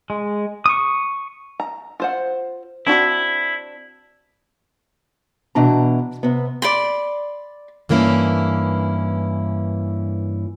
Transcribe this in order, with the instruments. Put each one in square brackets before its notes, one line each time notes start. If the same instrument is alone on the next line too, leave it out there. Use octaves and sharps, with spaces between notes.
[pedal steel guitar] G#3
C#6 D#6
[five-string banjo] A#5
F4 C5 F#5
[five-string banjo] C4 D4 F#4 [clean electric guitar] E4
[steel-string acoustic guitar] B2 E3 D4 A#5
C3 B3
[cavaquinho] D5 B5 C6
[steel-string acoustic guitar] G2 E3 A#3 C#4 E4